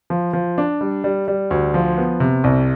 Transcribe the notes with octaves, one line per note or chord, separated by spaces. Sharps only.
F3
F3
D4
G3
G3
G3
D2
F3
B3
C3
C2